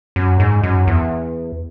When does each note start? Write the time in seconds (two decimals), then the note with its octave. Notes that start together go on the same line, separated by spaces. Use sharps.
0.16 F#2
0.40 G#2
0.63 F#2
0.87 E2